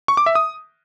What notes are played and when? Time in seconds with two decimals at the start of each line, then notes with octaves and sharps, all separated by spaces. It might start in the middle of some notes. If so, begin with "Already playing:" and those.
0.08 C#6
0.17 D6
0.26 E5
0.35 D#6